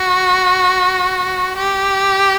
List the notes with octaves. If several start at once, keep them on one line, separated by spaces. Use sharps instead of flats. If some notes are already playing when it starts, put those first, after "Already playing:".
Already playing: F#4
G4